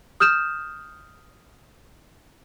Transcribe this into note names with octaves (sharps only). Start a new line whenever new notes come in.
D#6 F6 G6 E7